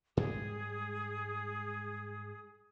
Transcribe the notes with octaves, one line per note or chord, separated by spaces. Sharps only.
G#2 G3 G#3 G#4 D#6